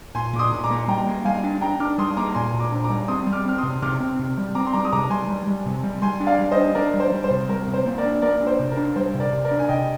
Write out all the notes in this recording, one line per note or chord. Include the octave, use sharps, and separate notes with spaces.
A#2 G#5 C6
A#2 D6
C6 D#6
A#2
A#5 D6
A#3
G3 G5 A#5
A#3
G3 F5 G#5
D4
D4 G5 A#5
D4 D6 F6
G3 C6 D#6
A#3 A#5 D6
A#2 G#5 C6
A#2
A#5 D6
D4
A#5 D6
G3
C4 C6 D#6
G3
D6 F6
C4 F6
C6 D#6
C3
C3 D6 F6
C4
C3
G3
C4 A#5 D6
C6
G3 A#5 D6
D#6
C3 A#5 D6
G3 G#5 C6
G3
G3
C3
G3
G3 G#5 C6
D4
D5 F5
G3
C5 D#5
D4
D4 A#4 D5
G3
C5
G3
C5
C3
G3 A#4
C3
C5
A#3
A#4 D5
D4
A#3 A#4 D5
D4
C5
C3
A#4
D4
G3 C5
C3
A#4 D5
C3
A#4 D5
D4
G#5
C3 D#5 G5